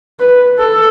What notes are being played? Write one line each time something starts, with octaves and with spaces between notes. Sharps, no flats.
B4
A4